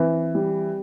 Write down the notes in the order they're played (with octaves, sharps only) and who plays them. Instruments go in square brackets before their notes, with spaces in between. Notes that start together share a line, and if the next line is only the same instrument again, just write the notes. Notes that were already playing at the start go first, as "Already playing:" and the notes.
Already playing: [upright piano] E3 [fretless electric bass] C4
[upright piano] G3